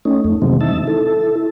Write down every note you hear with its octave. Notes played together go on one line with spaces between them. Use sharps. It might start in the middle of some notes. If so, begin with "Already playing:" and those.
A3 C#4 D#4
F2 A3
C3 D#3 E3 F#3 G#3 C4
D#4 E5 A5
E4 A4